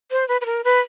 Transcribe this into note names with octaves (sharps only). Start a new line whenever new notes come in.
C5
B4
B4
A#4
B4